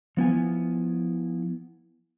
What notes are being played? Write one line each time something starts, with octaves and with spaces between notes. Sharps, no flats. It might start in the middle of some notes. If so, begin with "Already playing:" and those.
F3 B3 E4 G#5